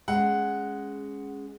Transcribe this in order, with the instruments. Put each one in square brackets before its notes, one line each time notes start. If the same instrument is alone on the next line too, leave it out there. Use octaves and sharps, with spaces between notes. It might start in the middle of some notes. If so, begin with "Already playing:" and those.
[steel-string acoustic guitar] G#3 C#4 [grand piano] F#5